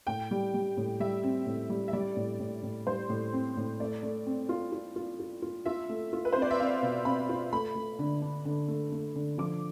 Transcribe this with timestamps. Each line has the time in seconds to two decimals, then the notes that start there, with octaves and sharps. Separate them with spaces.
0.07 A2 G5
0.31 G3
0.54 G3
0.77 A2
1.00 G3 E5
1.24 C4
1.46 A2
1.70 G3
1.88 E5
1.93 G3 D5
2.16 A2
2.40 A2
2.63 A2
2.87 G3 C5
3.09 A2
3.33 C4
3.57 A2
3.80 A3 D5
4.03 A3
4.26 C4
4.49 F4
4.72 F4
4.96 F4
5.20 F4
5.42 F4
5.65 F4 E5
5.89 A3
6.13 F4
6.25 B4
6.33 C4 C5
6.42 D5
6.50 E5
6.60 C4 F5
6.83 B2
7.05 C4 B5
7.29 F4
7.53 A3 B5
7.75 A3
7.99 D3
8.22 D4
8.45 D3
8.68 A3
8.92 A3
9.16 D3
9.38 F3 D6